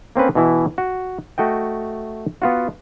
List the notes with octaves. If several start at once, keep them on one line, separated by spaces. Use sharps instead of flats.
A#3 C4 C#4 B4
B2 E3 E4
F#4
A3 F#4 D#5 G5
B3 F4 F#4